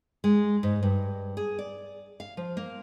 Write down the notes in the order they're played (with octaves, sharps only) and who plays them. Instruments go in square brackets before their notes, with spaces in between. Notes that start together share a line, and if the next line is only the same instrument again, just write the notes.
[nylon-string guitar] G#3
G#2
G2
G#4
D5
F5
F3
A#3